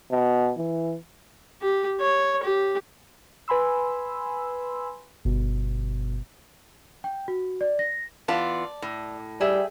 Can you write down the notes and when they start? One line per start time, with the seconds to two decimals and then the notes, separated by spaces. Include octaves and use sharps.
0.12 B2
0.58 E3
1.62 G4
2.01 C#5
2.43 G4
3.48 B4 G#5 B5 C6 E6
5.25 G1 B2
7.04 G5
7.28 F#4
7.61 D5
7.79 A#6
8.28 E3 B3 F4 D5 A5
8.82 A2
9.41 G3 G#4 E5 G5